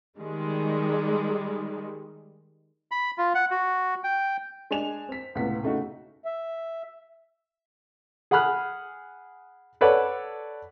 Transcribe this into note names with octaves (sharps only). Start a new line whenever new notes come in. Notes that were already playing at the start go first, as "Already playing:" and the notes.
D#3 G3 G#3
B5
F4
F#5
F#4
G5
G#3 D4 G#5 E7 F7
C4 B6
C#2 A2 C3 B3 F#5 B6
C#3 A3 D#4 F#4
E5
G#4 F#5 G#5 B5 F6 F#6
A4 B4 C#5 D5 F#5